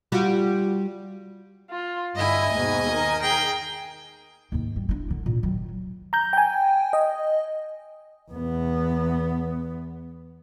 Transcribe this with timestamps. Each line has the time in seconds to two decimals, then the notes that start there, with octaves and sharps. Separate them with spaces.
0.12 G3 F4 F#4
1.70 F4
2.15 G2 D3 E4 D#5 G#5
2.52 D#2 G#2 B2
2.90 D#3 A#4
3.21 G#4 G5
4.52 D#2 G#2
4.76 G3
4.89 D4 E4
5.11 D3
5.26 A#2
5.43 D#3 F#3
6.13 A#5 G6
6.33 G5 G#5
6.93 D#5
8.31 E2 B3